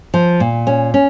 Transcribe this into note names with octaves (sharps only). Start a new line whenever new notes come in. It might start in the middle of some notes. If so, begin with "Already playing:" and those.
F3
A#2
C#4
C#4